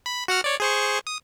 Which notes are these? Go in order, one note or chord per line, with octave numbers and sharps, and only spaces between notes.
B5
F#4 F#5 F6
C#5 D5
G#4 C5 C#6
D#6